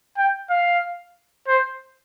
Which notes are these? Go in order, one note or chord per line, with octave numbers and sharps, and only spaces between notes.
G5
F5
C5